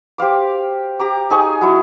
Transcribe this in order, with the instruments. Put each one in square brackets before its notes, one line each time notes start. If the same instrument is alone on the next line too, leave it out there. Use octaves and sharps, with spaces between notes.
[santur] G4 C5 F5 D6
G4 A#5 D6
D#4 G#4 C#5 G#5
F#3 E4 C#5